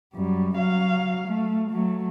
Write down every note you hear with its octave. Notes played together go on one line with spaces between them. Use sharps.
F#2 G3
F#3 F5
A3
F#3 A3